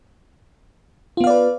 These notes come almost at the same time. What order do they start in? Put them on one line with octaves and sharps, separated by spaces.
F4 B3 F5 D5 B4